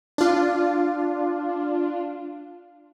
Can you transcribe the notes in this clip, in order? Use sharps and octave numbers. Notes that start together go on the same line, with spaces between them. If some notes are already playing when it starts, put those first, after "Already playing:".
D4 F4